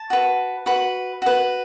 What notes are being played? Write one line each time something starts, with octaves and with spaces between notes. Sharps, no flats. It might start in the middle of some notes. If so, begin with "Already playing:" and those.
Already playing: A5
F#4 B4
F#4 B4 B5
F#4 B4